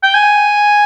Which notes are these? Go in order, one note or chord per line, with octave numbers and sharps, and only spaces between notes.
G5
G#5